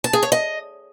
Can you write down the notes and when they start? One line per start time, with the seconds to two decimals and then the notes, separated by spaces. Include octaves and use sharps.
0.04 A5
0.13 G#4
0.23 C#5
0.32 D#5